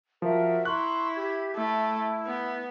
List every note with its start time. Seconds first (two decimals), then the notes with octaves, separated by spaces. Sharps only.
0.22 F3 F#4 A#4 E5
0.65 E4 A#5 C6 C#6 F#6
1.16 G4 E5 G#6
1.56 A3 E4
2.26 B3